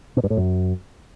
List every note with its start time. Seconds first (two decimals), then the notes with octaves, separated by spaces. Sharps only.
0.17 B2
0.23 G2
0.30 A2
0.37 F#2